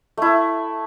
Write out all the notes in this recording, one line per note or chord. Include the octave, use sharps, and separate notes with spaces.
A3 E4